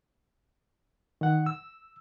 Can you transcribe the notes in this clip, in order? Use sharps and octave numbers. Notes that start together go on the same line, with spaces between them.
D#3 F#5
E6